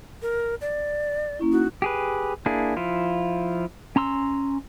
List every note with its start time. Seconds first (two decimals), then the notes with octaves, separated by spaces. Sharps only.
0.22 A#4
0.61 D5
1.39 A#3 C#4 E4
1.52 D#4 F#4
1.82 G4 G#4 B4
2.46 A#3 D4 E4 G#4
2.77 F3 E4 F4
3.96 C#4 A#5 C6 E6